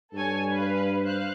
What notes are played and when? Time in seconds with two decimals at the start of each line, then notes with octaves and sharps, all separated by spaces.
0.13 G2 A4 C#5 G#5
0.49 B4 F5
1.04 C5 F5 F#6